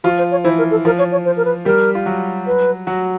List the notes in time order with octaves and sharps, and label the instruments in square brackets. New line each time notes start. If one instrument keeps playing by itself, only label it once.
[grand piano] F3 F4 [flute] F#4
[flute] C5
C#5
[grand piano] E3 E4 [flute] C5
[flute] A#4
A4
[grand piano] F3 F4 [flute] A#4
[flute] C#5
C#5
C5
A#4
B4
[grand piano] G3 G4 [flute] A#4
[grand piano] F4
F#3 F#4
[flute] B4
[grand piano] F#3 F#4